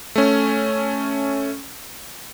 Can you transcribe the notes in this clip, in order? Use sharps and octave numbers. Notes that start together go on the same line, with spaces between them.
A3 C#4